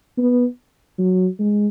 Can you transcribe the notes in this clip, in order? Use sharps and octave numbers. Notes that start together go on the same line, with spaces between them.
B3
F#3
G#3